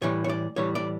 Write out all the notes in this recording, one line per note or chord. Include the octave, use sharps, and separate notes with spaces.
A2 E3 G3 C#5
C#5
D5
A2 E3 G3 C#5
D5